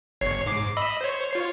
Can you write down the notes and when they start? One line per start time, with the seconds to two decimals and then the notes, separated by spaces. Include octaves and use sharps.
0.21 G1 C#5 C7
0.46 G#2 D6 C7
0.77 D#5 B5 E6
1.01 C5 C#5
1.31 F4 C#5 C7